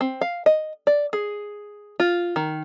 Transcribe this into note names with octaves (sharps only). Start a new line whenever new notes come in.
C4
F5
D#5
D5
G#4
F4
D#3